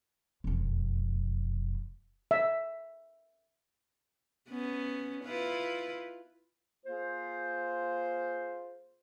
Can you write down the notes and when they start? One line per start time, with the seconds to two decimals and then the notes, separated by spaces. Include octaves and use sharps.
0.44 E1 F2
2.31 E5
4.49 B3 C#4
5.24 E4 F4 B4
6.86 A#3 F4 G#4 C5